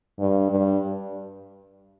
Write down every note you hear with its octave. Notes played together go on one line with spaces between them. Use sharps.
G2
G2